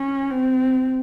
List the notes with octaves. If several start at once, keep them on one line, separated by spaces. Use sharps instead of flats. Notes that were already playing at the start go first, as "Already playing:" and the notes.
Already playing: C#4
C4